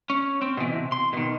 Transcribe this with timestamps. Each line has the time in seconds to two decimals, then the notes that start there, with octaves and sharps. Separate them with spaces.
0.10 C#4
0.42 C4
0.57 B2 E3
0.72 C3
0.92 C6
1.13 B2 D#3